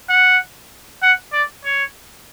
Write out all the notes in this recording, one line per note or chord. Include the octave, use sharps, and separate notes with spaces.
F#5
F#5
D5
C#5